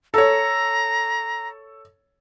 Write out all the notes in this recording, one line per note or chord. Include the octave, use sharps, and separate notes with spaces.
A4 C#5 A#5